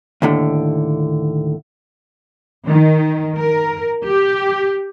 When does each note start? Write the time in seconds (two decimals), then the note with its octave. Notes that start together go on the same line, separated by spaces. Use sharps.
0.22 D#2 A2 D3
2.68 D#3
3.38 A#4
4.05 G4